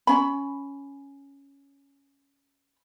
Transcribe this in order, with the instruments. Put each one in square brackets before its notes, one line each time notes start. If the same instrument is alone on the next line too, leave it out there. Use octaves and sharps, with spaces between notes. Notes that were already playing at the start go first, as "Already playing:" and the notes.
[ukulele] C#4 B5